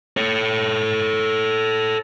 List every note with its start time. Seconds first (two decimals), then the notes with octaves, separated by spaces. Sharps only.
0.17 A4 C#5